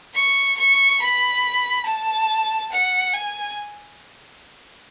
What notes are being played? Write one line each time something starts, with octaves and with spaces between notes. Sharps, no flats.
C#6
C#6
B5
A5
F#5
G#5